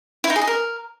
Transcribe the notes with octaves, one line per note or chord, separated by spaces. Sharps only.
E4
D#4
G#4
D#5
A#4